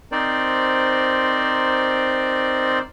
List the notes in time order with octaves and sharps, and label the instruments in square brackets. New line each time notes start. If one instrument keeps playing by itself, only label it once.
[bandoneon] C4 D#4 A#4 C5 D5